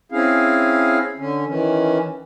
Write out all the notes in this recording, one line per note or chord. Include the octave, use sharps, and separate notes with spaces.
C4 C#4 E4 G#4 F5
D3 C#4
D#3 E3 C#4